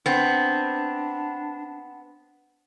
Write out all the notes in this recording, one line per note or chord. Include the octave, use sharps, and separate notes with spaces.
B3 C4 D4